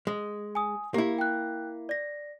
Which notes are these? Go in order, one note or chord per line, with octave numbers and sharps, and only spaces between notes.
G#3
G#5 D#6
A#3 E4 G4
G5 F#6
D5 A#6